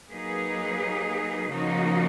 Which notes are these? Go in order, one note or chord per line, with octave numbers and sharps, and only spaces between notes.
F#3 A#3 D#4 G#4 B4
C#3 F3 A#3 D#4 F#4